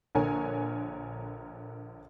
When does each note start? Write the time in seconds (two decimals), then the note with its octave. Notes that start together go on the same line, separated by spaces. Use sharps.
0.15 A#1 D3 A#4 C#5 G#5